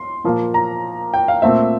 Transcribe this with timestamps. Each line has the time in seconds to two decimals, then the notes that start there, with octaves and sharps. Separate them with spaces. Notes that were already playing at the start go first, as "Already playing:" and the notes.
Already playing: C6
0.24 A#2 F3 A#3
0.54 A#5
1.14 G5
1.28 F5
1.42 A#2 A3 C4 E5